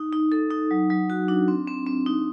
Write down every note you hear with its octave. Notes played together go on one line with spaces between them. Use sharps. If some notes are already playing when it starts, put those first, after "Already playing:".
Already playing: D#4
D#4
A4
D#4
F#3
F#3
F#4
D4
C4
C4
C4
D#4